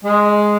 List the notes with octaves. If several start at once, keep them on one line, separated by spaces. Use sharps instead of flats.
G#3